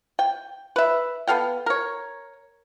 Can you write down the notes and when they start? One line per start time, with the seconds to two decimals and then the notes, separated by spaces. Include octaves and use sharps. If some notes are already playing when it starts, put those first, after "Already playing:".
0.19 G5
0.76 B4 E5
1.28 B3 A4 F5 G5
1.66 A#4 C#5